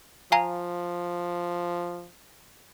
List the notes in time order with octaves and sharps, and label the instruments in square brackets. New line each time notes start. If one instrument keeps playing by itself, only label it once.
[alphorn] F3 [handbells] F5 G#5 A#5